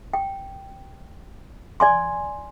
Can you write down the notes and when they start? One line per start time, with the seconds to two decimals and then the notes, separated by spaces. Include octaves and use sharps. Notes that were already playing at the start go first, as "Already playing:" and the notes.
0.13 G5
1.80 D5 G#5 C6